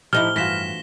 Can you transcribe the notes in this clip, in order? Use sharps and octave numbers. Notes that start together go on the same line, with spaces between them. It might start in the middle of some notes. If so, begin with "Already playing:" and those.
A2 F3 D#4 E4 G4 F6 G7
G2 E3 F4 F#4 A#6 B6 E7